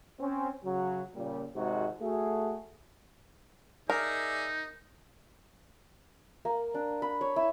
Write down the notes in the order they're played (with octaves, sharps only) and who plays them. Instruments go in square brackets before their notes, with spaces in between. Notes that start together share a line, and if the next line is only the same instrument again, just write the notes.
[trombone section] C4 C#4
C#3 F#3
A#2 C#3 G3
G#1 G#2 C3 G#3 D#4 F#4
A3 F#4 G#4
[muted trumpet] D#4 [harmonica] G#4 D5 E5 [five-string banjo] A#4
[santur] A#3
D4
B5
C#5
E4